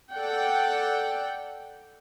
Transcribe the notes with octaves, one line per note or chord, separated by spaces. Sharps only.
A4 D5 F#5 G5